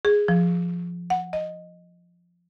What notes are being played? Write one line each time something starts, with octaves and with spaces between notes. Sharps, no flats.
G#4
F3
F#5
D#5